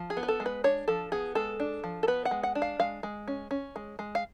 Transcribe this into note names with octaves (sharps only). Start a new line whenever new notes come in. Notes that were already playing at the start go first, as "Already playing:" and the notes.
Already playing: F3
G#4
B3
B4
A4
G#3
B4
D4 C#5
F3 A4
B3 G#4
G#3 A4
D4
F3
A4
B3 B4
F#5
G#3
F#5
D4
F5
G#3 F5
G#3
C#4
C#4
G#3
G#3
F5